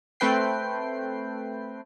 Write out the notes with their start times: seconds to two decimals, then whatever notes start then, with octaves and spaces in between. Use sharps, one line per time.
0.20 A3 C4 B4 G5 C7